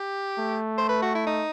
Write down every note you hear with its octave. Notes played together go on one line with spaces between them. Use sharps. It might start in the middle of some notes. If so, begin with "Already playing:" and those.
Already playing: G4
A3
C5
B4
F#4
E4
D#4